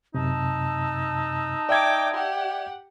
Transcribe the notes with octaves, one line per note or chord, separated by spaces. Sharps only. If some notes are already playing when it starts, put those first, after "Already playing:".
F#2 C3 D#4 A5 E6
D5 E5 G5 D6 G#6
G4 F#5